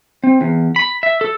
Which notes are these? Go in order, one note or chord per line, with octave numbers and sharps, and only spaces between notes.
C4
E2
B5
E5
A4